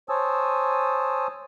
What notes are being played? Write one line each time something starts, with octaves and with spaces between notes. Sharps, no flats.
C5 C#5 G#5 A5 D#6 E6